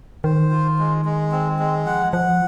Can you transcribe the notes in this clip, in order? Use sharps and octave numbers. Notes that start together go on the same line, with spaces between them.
D#3 C5
F4
G#3
G#3
C4
G#3
F3 F#5
F3 F#5